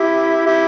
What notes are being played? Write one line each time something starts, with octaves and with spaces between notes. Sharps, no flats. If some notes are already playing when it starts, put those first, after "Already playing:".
Already playing: E4 G4
E4 G4